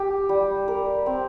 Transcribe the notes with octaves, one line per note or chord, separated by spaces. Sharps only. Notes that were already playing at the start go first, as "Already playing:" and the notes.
Already playing: G4
G3
A#4
C4